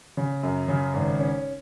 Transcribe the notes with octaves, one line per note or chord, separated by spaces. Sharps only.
C#3
F#2
C#3
G#1
C#4